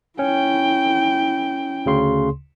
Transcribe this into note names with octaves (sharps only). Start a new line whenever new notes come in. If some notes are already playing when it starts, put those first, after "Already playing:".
C#4 E4 G5
D2 C#3 C6